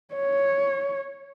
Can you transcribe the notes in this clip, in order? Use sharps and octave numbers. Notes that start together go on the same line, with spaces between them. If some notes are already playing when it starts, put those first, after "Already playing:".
C#5